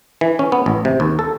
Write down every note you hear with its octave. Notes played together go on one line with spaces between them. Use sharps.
E3
C#4
B3
A1
C3
D#2
A4